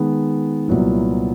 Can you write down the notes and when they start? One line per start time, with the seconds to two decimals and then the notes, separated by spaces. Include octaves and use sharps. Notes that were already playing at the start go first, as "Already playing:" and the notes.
Already playing: D#3 G#3 B3
0.68 C2 A#2 F#3 B3 E4